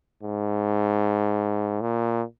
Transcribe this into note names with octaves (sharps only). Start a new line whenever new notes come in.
G#2
A#2